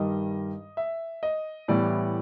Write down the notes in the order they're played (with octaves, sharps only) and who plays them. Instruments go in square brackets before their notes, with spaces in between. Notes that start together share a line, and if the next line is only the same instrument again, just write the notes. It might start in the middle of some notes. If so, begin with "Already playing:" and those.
Already playing: [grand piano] G2 D#3 G3 D#5
E5
D#5
A2 E3 G3 B3 D5